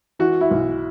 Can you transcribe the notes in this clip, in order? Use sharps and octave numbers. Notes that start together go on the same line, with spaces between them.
E3 F#4
E4
B1